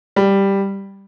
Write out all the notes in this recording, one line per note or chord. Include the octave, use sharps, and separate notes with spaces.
G3